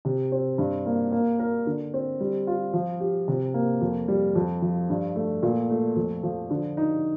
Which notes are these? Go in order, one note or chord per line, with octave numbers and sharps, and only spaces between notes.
C3
C4
G2
A#3
A#3
A#4
D3
C4
G3
F4
F3
G4
C3
A#3
F2
G3
F2
F3
G2
A3
A#2
A3
F2
F3
D3
D#4